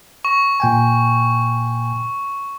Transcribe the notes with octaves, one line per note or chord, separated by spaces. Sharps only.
C#6
A#2 G5 G#5